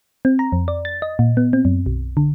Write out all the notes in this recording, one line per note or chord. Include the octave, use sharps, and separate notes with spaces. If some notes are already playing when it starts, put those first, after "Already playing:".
C4
A#5
F2
D5
A6
D#5
A#2
B3
C4
F#2
B1
D3